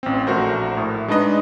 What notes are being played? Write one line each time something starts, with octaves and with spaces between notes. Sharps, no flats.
A1 C4
A#1 A3 F#4 A#4 C5
A2
G#3 D4 D#4 B4 D#5